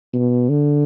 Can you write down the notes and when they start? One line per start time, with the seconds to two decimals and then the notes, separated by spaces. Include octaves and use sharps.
0.13 B2
0.49 D3